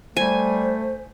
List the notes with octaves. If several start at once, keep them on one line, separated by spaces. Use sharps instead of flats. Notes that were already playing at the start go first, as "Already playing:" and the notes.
G3 A3 C5 G#5